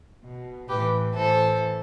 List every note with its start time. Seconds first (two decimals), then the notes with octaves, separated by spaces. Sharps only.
0.23 B2
0.69 A2 E3 G4 B4
1.15 A2 E3 A4 C5